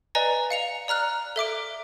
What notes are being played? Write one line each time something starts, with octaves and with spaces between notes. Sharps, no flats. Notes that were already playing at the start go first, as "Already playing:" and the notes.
B4 D5 D#5 G#5 A#5
F5 C#7 F7
D5 A#5 F6 F#6
A4 E5 D6 D7